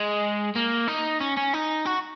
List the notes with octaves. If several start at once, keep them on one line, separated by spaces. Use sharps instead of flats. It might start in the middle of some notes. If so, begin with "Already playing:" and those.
Already playing: G#3
A#3
D#4
C#4
C#4
D#4
F#4